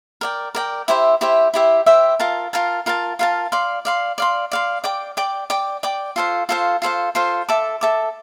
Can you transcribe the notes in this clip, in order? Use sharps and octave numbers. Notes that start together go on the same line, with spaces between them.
A#4 D5 G5
A#4 D5 G5
E4 G4 C5 E5
E4 G4 C5 E5
E4 G4 C5 E5
E4 G4 C5 E5
F4 A#4 F5 A5
F4 A#4 F5 A5
F4 A#4 F5 A5
F4 A#4 F5 A5
D5 F5 C6
D5 F5 C6
D5 F5 C6
D5 F5 C6
D5 G5 D6
D5 G5 D6
D5 G5 D6
D5 G5 D6
F4 A4 C5 F5
F4 A4 C5 F5
F4 A4 C5 F5
F4 A4 C5 F5
A4 E5 A5 D6
A4 E5 A5 D6